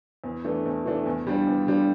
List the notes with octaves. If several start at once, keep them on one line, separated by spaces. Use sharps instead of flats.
E2
E3 A3 D4
E2
E3 A3 D4
E2
D3 G3 D4 F4
E2
D3 G3 D4 F4